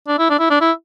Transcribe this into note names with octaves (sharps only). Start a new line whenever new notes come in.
D4
E4
D4
E4
D4
E4